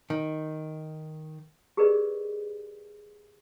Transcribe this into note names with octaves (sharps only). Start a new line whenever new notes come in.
D#3
G4 G#4 A#4 B4 D5 D#5